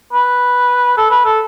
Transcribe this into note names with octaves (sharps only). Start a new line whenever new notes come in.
B4
A4
B4
A4